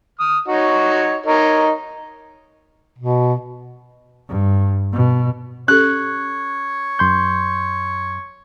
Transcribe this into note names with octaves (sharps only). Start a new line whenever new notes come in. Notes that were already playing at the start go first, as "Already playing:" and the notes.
D#6 F6
D#4 F#4 C#5
D#4 A#4 C#5
B2
G2
B2
C#4 G4 A4 C#5 F#6
F#2 C6 G6